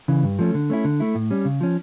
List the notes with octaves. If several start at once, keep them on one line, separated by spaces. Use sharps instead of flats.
C#3 E3
G2
F3 A3 C#4
D3
A3 C#4 E4
D3
A3 E4
A2
G3 C#4
C#3
F3 C#4